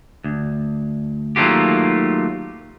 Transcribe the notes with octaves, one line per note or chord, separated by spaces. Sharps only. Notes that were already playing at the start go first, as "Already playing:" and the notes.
D2
D#3 F#3 A3 A#3 F4 G4